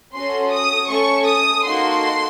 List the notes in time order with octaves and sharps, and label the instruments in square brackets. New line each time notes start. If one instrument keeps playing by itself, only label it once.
[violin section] C#4 F#4 A4 C6
D#6
A3 C#4 A4 C#6
D#6
A#3 D#4 F#4 A4 C6